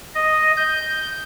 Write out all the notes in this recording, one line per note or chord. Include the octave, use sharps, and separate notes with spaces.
D#5
G6